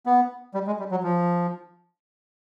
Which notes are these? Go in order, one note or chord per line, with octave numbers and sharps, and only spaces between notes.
B3
G3
G#3
G3
F#3
F3